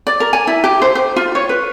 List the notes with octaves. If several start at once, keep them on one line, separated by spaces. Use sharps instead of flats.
D5
A#4
G#5
E4
G4
C5
C5
F4
C#5
B4